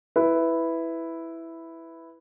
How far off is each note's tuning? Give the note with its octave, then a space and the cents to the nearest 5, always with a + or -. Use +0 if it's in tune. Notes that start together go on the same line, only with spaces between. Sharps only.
E4 +0 B4 +5